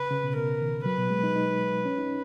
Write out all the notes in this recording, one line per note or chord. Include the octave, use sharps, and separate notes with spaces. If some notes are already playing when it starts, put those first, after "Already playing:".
Already playing: C#3 B4
C#3
B2
B2 A#4
D#3
F#3 B4
B2
G#3
D#4
D#4
C#4
D#4